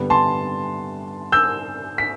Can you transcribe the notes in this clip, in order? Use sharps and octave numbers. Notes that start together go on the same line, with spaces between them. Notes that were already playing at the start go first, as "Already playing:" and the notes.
Already playing: G2 D3 G3 B3
A5 C6
E6 G6
B6